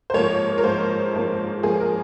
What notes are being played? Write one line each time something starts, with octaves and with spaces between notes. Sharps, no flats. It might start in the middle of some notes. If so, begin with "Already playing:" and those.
C5
G#2 F3 A#3 C#5
A#4
G#2 F3 A#3 C5
G#2 F3 A#3
G#2 F3 A#3 G#4
A#4